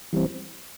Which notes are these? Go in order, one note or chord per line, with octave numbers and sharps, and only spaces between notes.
E3 G3 C4